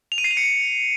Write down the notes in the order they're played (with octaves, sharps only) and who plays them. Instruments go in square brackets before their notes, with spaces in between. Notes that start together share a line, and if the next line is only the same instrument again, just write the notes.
[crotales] F7
D#7
C7
F7
C#7